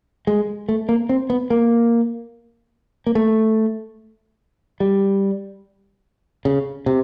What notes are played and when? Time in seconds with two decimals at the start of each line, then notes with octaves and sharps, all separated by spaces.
0.27 G#3
0.69 A3
0.89 A#3
1.09 C4
1.30 B3
1.50 A#3
3.07 A#3
3.15 A3
4.80 G3
6.45 C#3
6.86 C3